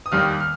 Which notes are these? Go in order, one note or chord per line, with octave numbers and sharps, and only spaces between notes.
D#6
D#2 D#3 G3 F6
F6